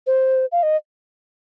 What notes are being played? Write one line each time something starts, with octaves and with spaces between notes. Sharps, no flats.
C5
F5
D#5